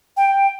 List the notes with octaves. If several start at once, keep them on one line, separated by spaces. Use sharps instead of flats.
G5